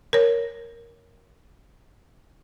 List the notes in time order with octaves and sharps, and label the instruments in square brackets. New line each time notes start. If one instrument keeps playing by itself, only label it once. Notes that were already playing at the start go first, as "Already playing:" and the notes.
[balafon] A#4 C#5